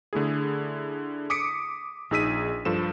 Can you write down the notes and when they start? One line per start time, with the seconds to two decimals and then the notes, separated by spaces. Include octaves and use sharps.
0.13 D3 A3 E4 G#4
1.30 D6 D#6 B6 C#7 D7
2.11 A#1 D#4 G#4 E6 B6 D#7
2.65 G2 F3 A4 E7